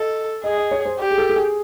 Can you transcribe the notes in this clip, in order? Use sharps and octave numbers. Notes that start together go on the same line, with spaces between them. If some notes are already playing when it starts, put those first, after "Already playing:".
Already playing: A4 D#5
G#4 D#5
D#5
C#5
C5
G4 D5
G#4
A4
A4
G#4